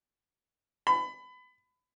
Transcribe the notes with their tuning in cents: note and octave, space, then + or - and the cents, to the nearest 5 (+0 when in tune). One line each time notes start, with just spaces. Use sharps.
B5 +25